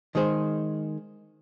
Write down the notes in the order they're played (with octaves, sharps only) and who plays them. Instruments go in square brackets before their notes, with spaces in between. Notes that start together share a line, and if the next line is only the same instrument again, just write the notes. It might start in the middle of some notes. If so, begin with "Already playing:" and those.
[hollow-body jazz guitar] D#3 G#3 G#4 C5